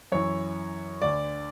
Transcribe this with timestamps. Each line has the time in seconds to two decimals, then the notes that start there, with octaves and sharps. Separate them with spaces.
0.12 F#2 E3 C#5
1.02 D2 D3 D5